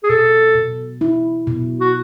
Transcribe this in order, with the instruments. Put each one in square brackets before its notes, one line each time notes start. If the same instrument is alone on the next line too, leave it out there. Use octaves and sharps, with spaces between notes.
[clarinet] G#4
[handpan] B2 [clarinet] A4
[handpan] B2
E4
B2
[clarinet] F#4